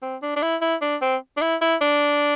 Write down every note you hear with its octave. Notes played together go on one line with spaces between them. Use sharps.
C4
D4
D4
E4
E4
D4
C4
D4
E4
E4
D4